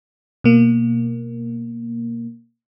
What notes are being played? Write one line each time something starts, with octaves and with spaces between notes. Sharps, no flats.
B2 A#3